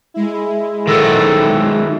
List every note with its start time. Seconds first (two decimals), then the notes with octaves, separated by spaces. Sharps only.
0.14 G#3 E4
0.88 D#3 F#3 A4